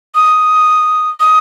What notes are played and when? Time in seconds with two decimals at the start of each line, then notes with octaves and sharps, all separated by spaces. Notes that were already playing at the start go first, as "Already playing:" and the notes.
0.15 D#6
1.20 D#6